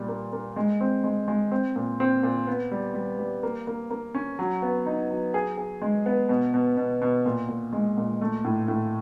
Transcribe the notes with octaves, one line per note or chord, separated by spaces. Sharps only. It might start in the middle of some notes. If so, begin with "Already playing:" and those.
Already playing: A#2 G3
A#3
A#3
G#3
C4
G#3
G#3
C4
A#2
C4
A#2
B3
G3
G3
G3
A#3
A#3
A#3
C#4
F#3
B3
D#4
F#3
G#4
G#4
G#3
B3
B2
B2
B2
B2
A#2
A#2
G#3
A#2
A3
A2
A2